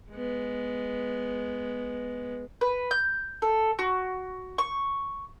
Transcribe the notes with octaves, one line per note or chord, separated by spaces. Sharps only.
G#3 B3
B4
G6
A4
F#4
C#6